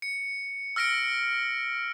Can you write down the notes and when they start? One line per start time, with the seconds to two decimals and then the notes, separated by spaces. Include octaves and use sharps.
0.02 C#7
0.76 E6 F6 A#6 C#7 D7